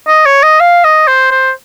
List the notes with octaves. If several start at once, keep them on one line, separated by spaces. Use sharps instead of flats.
D#5
C#5
D#5
F5
D#5
C5
C5